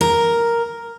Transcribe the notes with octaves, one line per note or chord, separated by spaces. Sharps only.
A#4